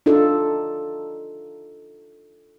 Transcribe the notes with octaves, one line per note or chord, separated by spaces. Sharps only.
D4 D#4 F4 A4